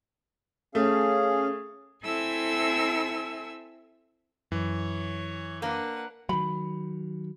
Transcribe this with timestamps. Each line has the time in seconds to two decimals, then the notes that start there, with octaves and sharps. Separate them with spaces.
0.75 A3 C#4 G#4 F5
2.04 C4 E4 A4 E5 G#5 E6
4.52 F#2 E3 C#5
5.62 A#3 D4 B4 F#5
6.29 D#3 F#3 B5